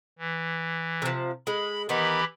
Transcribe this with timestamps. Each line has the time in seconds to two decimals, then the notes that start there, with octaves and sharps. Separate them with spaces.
0.19 E3
1.02 C3 F3
1.47 G#3 B5
1.89 D#3 E3 B3 D#4 G4 B5